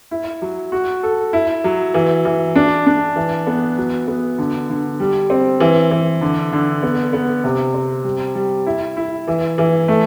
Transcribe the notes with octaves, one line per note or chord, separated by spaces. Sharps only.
E4
F#3
F#4
A4
E4
F#3
E3
E3
D4
D4
E3
B3
F#3
B3
D3
D3
G3
C4
E3
E3
D3
D3
B3
B3
C3
C4
G3
G3
E4
E4
E3
E3
A3